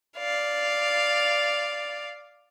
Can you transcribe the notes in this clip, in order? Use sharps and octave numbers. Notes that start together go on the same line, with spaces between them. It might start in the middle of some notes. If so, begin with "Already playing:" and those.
D5 F5